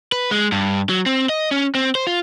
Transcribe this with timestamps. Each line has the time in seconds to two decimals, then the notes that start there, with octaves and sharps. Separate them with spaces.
0.12 B4
0.31 G#3
0.52 G2
0.89 F#3
1.06 C4
1.29 D#5
1.51 C#4
1.75 C4
1.95 C5
2.07 F4